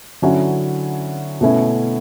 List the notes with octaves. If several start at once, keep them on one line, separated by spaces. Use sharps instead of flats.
D3 F#3 C#4 E4
B2 A3 C#4 E4